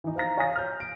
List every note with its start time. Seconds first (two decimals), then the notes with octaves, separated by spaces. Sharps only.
0.04 E3 D#4
0.16 C5 F5 A#5 A#6
0.37 C#5 F5 G#5 D#6 A#6
0.56 F6 G6
0.80 D7